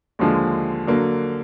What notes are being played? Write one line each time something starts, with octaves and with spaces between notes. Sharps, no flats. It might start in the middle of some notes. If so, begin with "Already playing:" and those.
D#2 D3 F3 G#3
D3 F#3 A#3